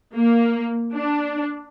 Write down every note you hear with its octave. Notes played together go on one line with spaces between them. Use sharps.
A#3
D4